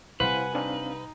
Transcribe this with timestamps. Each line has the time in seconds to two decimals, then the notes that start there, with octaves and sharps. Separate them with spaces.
0.20 C3 G3 E4 B4 C5 F5 F#5 G#5
0.55 C4 D4 D#4 F5